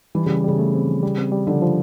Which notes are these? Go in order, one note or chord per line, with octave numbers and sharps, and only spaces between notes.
E3 G3
C#3
G3
C#3 G3
A3
C4
F3
G3
C4
G3
D3 F3
F3